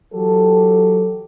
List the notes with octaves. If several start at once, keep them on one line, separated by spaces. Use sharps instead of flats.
E3 F#3 G4 A4